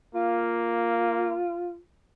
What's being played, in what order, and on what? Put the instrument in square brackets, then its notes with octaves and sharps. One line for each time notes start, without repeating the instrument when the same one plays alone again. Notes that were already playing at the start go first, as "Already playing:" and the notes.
[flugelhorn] A#3 [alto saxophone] F4